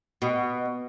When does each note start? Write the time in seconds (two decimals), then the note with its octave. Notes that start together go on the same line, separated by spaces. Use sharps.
0.22 B2